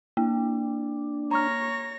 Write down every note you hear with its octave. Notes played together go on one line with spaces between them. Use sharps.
A#3 D4
C#5 A#5 C#6 F6 A#6